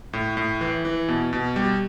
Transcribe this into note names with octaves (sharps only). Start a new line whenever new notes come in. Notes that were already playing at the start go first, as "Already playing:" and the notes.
A2
A2
E3
E3
B2
B2
G3